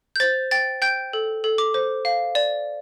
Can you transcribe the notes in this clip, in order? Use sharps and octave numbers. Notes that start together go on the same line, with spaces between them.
G6
C5 A6
G5 A6
G5 G6
A4
A4
D6
C5
F5
D5